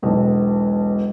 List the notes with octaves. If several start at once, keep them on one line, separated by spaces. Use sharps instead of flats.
E1 B1